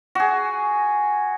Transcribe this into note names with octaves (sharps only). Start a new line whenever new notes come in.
F#4 G#4